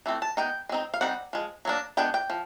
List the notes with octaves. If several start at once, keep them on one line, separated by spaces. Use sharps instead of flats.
E3 A3 C4
A5
G#3 B3 D#4 G5
G#3 C4 D#4
F5
G3 C4 D#4 F#5
F3 G#3
F#3 A#3 D4
G#3 B3 D4 G5
G5
F3